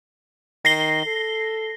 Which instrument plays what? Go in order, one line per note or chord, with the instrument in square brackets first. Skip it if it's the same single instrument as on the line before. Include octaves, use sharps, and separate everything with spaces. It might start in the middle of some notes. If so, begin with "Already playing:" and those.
[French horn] D#3 [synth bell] A#6 C7 G7
[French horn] A4